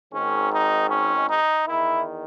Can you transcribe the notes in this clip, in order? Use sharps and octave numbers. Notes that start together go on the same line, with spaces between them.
G#1 G#2 D#3 C#4
D#4
C#4
D#4
E2 D#3 E4